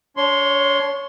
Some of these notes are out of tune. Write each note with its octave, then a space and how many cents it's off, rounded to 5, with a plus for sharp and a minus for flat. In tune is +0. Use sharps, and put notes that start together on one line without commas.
D4 -35 C#5 +0 C6 +0